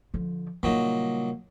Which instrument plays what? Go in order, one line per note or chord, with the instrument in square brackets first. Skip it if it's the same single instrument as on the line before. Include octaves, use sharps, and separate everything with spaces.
[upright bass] D3 F3
[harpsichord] A#2 F#3 D#4 [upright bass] C#3 G3